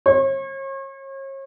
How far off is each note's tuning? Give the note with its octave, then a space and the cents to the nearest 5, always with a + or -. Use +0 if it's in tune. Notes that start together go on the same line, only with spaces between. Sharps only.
C#5 -40